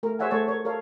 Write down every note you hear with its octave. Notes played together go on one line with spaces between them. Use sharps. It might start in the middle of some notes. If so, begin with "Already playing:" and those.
A3 A#4
G#4 C5 C#5 E5 F#5 G#5
A3 C5 C#5 A5
A#4 C#5
A4 A#4 C#5 F5